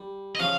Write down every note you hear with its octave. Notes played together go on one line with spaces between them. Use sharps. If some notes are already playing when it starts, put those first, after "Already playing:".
Already playing: G3
D#5
C#3 F3 F5